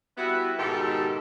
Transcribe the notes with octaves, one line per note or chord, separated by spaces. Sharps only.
G3 B3 E4 F#4 B4 E5
G#2 B2 D#3 G4 A4